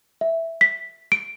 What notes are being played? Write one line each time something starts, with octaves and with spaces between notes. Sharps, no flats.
E5
B6
D7